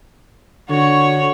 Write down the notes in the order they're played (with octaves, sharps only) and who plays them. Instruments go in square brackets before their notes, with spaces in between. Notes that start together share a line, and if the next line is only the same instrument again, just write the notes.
[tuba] D3 [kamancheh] F#4 C#5